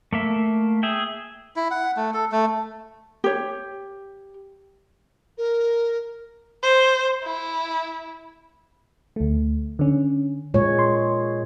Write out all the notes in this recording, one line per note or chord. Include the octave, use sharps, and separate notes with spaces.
A3 A#3 E5
G#4 E5 G5
E4
F#5
A3
A4
A3
G4 C#5
A#4
C5
E4
D2 A3
D3 C#4
A#2 G#3 C#5
C6